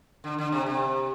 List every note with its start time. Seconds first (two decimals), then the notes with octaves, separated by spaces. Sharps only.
0.24 D3
0.38 D3
0.52 C3
0.66 C3